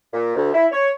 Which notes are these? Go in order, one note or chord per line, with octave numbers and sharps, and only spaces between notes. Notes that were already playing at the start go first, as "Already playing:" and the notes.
A#2
D2
E4
C#5